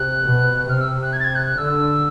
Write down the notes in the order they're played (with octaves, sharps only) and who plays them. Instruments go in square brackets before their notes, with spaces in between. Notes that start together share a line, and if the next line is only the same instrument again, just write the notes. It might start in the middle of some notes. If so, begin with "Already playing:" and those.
Already playing: [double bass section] C3 [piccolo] F#6
[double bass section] B2
[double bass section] C3 [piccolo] F6
[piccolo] E6
F#6
G#6
A6
G#6
F#6
F#6
[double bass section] D3 [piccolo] E6